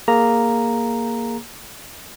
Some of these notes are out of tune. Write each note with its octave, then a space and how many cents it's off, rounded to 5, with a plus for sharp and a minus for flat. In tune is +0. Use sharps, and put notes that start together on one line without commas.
A#3 +0 G#4 +0 A#5 +0